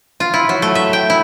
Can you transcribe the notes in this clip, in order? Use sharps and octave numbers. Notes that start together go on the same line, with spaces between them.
F4
E4
F#3
A3
E5
G5
E4